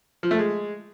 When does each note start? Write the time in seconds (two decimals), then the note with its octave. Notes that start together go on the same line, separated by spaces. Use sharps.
0.23 F3
0.31 A3
0.39 G#3